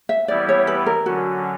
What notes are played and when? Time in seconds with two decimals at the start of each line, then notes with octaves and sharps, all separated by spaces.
0.09 E5
0.28 E3 G3 B3 E4 G4 D5
0.49 C#5
0.67 B4
0.86 A#4
1.06 D3 F#3 C#4 F#4